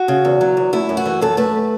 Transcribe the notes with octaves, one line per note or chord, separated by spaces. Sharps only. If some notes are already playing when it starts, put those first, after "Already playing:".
Already playing: F#4
C#3
E2
F#3
E2
A3 E4
F#2
F#4
E3
F#2 A4
A3 B4